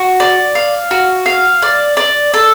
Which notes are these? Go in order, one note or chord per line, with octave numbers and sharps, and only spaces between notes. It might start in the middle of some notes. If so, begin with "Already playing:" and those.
Already playing: F#4
D5
F5
F#4
F5
D5
D5
A4